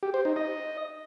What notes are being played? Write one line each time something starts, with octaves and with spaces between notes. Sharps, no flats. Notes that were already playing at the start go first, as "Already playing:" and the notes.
G4
C5
D#4
D#5